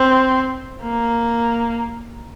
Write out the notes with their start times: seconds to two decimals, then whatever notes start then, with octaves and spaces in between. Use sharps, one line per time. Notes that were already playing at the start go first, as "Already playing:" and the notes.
Already playing: C4
0.83 A#3